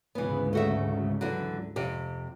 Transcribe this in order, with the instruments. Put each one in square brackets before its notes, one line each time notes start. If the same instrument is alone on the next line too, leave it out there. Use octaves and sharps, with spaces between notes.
[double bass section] D2 G#2 C#3 [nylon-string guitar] E3 B3
[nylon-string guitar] A3 F#4 E5
D3 E3 F#3
F2 C3 G4